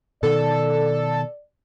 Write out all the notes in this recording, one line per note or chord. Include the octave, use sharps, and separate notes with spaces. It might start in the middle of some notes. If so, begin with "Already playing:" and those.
B2 D#3 A4 D5